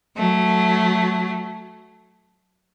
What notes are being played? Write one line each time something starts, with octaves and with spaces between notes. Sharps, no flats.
F#3 A3